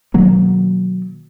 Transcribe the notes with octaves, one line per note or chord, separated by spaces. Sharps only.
B2 D#3 F#3 A#3